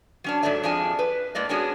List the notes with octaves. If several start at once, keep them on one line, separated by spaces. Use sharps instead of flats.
F#3 C#4 D4
G#2 F#3 G3 A3 D5 E5
F2 F3 G#3 D4 G#5
B4
A2 G#3 A#3 D5 D#5
G#3 B3 C#4 D4 F#4 G#4